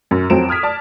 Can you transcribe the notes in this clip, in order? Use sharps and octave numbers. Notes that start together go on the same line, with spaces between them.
F#2
F2 F#3 C5 D7 E7
D#6 F6 G#6 B6
D5 A5